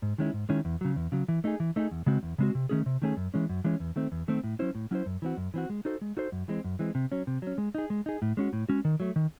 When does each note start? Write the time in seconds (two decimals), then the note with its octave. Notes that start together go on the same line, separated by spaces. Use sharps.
0.02 G#2
0.18 D#3 G#3 C#4 E4
0.34 G#2
0.49 D#3 G#3 C#4 E4
0.65 E2
0.81 C#3 F#3
0.96 E2
1.12 C#3 F#3
1.28 E3
1.44 A3 D#4 G#4
1.60 E3
1.76 A3 D#4 G#4
1.91 E2
2.06 C#3 G#3 C4 F#4
2.23 E2
2.38 C#3 G#3 C4 F#4
2.55 C3
2.69 D#3 A3 C#4 G#4
2.86 C3
3.02 D#3 A3 C#4 G#4
3.17 F#2
3.34 E3 G#3 C#4
3.49 F#2
3.64 E3 G#3 C#4
3.80 E2
3.96 D#3 A3 C4
4.12 E2
4.28 D#3 A3 C4
4.44 A2
4.59 F#3 C#4 E4 C5
4.75 A2
4.91 F#3 C#4 E4 C5
5.06 F#2
5.22 E3 C4 F#4
5.37 F#2
5.54 E3 C4 F#4
5.70 G#3
5.85 D#4 F#4 A4 C5
6.01 G#3
6.17 D#4 F#4 A4 C5
6.32 F#2
6.48 E3 G#3 C4
6.64 F#2
6.79 E3 G#3 C4
6.95 C3
7.12 F#3 C#4
7.27 C3
7.42 F#3 C#4
7.58 G#3
7.75 D#4 G#4
7.90 G#3
8.06 D#4 G#4
8.22 A2
8.37 G#3 C#4 F#4
8.53 A2
8.69 G#3 C#4 F#4
8.85 D#3
9.00 F#3 A3
9.16 D#3